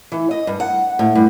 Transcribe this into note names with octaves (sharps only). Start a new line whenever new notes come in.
E3
D#5
G2
F#5
A2
G2